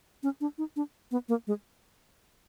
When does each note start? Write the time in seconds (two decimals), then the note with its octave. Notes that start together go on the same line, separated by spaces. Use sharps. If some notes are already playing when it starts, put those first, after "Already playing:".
0.23 C#4
0.41 D4
0.58 D#4
0.76 D4
1.11 B3
1.29 A#3
1.47 G#3